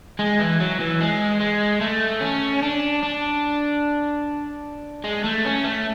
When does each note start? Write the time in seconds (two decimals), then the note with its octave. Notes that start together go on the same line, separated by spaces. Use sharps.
0.19 G#3
0.39 E3
0.60 F#3
0.80 E3
1.00 G#3
1.40 G#3
1.81 A3
2.21 C#4
2.62 D4
3.03 D4
5.04 G#3
5.24 A3
5.45 C#4
5.64 A3